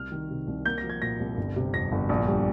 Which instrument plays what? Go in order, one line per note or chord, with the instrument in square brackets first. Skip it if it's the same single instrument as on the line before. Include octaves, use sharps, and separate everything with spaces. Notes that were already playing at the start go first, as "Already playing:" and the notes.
Already playing: [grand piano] C2 F6
D#3
C3
C2
A#3 G6
A#6
F3
G#6
A#2 A#6
C2
G1
C3
F2 A#6
G1
A#1
G3